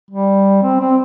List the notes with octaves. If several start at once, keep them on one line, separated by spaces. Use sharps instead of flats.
G3
C4
C4